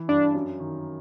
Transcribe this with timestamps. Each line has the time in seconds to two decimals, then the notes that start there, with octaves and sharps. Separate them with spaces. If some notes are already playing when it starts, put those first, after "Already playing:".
Already playing: E3
0.08 G2 D4
0.34 F#2
0.60 D#3